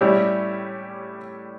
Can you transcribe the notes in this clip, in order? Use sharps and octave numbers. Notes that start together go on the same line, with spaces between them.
A2 G3 C#4 E4 G4